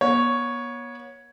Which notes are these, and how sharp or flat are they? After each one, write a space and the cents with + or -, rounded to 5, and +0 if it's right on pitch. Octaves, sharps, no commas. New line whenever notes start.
B3 -40 C#5 +0